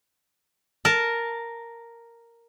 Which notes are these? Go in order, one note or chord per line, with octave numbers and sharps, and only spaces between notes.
A#4 A5